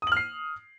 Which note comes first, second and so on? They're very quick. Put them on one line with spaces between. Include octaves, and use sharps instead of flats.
D#6 F#7 F6 C7